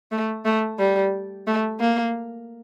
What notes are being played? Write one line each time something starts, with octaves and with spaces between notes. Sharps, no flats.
A3
A3
G3
A3
A#3